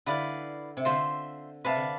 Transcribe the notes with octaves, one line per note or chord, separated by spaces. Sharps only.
D3 E4 B4 D5 F5
C3
D3 F4 C5 E5
C3 B4 D5 F5 A5
D3